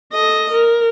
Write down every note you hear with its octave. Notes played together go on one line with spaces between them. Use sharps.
A4 D#5
A#4